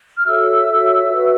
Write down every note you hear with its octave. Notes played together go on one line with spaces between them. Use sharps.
F6
F#4 A4 C#5 E5 E6
F#4 A4 C#5
F#4 B4